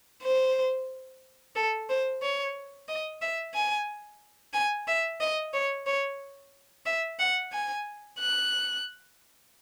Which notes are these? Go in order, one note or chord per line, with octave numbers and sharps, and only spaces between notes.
C5
A4
C5
C#5
D#5
E5
G#5
G#5
E5
D#5
C#5
C#5
E5
F#5
G#5
F#6